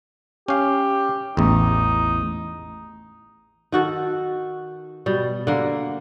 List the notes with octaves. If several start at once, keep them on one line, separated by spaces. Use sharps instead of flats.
C#4 G4 F5
A1 E2 D#4
D#3 F#4 A4
B2 G3
D3 A#3